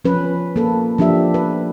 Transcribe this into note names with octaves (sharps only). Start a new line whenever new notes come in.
F3 C#4 B4
A#3 A4
F3 D4 G4 E5
B4